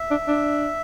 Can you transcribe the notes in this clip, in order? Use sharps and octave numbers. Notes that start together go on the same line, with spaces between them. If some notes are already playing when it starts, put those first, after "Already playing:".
Already playing: E5
D4
D4